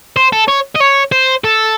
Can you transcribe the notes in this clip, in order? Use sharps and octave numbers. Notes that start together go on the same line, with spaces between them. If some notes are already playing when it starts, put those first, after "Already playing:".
C5
A4
C#5
D#5
C#5
C5
A4